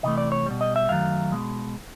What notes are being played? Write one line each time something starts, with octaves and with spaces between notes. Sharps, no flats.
C3 E3 A3 D#5
D5
C#5
B2 G3
D#5
E5
F#2 D#3 F#3 A3 F5
B2 G#3